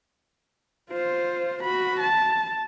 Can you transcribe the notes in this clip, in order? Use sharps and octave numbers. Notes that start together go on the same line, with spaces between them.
F4 C5
F#4 B5
A5